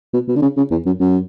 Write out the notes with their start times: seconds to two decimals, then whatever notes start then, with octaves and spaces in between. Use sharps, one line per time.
0.14 B2
0.28 B2
0.36 D3
0.42 C#3
0.57 C#3
0.71 E2
0.86 F#2
1.00 F#2